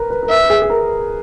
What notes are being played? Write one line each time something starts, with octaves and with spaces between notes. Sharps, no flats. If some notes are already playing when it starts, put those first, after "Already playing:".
Already playing: A#4 B4
B4
A#4
B4 E5
G#4
G#4
A#4